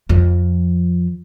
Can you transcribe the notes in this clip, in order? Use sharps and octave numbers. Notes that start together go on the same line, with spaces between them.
F2 F3